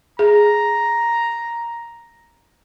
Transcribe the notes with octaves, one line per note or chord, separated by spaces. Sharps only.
G#4 A#5